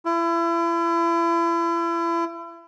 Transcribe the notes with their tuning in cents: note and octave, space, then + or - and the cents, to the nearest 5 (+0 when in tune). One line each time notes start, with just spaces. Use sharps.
E4 +35